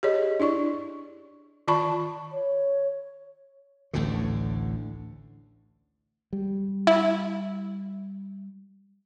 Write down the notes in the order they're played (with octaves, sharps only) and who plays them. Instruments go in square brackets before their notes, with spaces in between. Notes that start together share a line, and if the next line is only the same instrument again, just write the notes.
[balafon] G4 G#4 C#5 D#5
D4 E4 D5 C#6
D#3 F4 D5 A5 B5 C#6
[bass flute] C#5
[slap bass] A1 D2 A2 D3
[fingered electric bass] G3
[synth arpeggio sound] E4